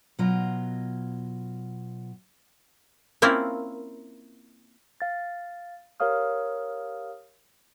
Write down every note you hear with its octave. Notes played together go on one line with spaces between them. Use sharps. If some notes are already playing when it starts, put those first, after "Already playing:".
B2 F#3 F4 D#5 A#5
A#3 C4 C#4 E4 F4 A#4
F5 A6
G4 A#4 C#5 F5 D#6 F6